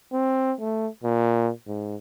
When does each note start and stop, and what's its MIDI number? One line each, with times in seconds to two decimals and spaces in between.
0.13 0.53 60
0.60 0.88 57
1.03 1.51 46
1.67 1.96 44